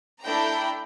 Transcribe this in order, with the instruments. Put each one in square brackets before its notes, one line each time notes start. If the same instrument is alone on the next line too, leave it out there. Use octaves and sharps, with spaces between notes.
[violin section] A3 D4 E4 G5 A#5